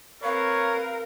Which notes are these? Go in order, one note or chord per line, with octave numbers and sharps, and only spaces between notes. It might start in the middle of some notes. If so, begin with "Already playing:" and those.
C4 A#4 B4 C#5 F5